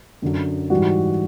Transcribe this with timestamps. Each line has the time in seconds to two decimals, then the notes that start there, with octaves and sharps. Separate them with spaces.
0.22 F#2 D3 F#3
0.70 G#2 E3 G3 F#4